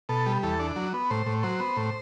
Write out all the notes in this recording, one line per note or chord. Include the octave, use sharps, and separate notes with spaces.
B2 A4
G3
E2 A4
D4
F#3
B3
A2 C5
A2
F#3 C5
B3
A2